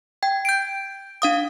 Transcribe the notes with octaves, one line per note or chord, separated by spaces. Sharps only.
G5 G#6
G6 D7
D4 F5 D#6